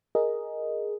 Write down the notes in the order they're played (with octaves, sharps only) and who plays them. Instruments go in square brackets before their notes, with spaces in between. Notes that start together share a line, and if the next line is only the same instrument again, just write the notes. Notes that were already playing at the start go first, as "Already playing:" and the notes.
[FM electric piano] G#4 A#4 D#5